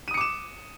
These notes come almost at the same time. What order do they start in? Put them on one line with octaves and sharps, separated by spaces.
D#7 D#6 C#7 D6 E7